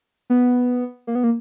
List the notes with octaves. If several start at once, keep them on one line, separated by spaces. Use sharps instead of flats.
B3
A#3
B3
A#3